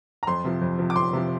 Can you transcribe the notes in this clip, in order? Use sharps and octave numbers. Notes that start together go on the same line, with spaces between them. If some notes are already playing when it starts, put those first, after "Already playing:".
A#5
F2 C6
C3 F3
F2
C3 F3
D6
F2 C6
C3 F3